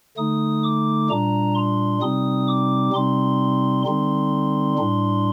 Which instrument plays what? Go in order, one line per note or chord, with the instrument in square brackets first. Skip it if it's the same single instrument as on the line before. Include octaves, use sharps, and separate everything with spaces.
[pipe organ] D3 A3 D#4 D#6
D6
A#2 G3 D4 A#5
C6
C3 G3 C4 D#4 D#6
D6
C3 G3 C4 D#4 C6
D3 G3 C4 D#4 C6
A2 G3 D4